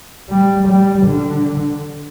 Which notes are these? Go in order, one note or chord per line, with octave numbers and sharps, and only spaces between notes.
G3
G3
D3